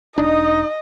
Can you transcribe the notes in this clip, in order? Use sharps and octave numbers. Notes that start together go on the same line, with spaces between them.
E1 D4 D#4 D#5